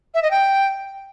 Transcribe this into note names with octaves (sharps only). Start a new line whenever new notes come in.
E5
D#5
G5